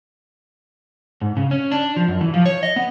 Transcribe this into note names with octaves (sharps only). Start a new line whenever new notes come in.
G#2
C#3
C#4
D4
F3
F#2
E3
F3
C#5
D#5
B3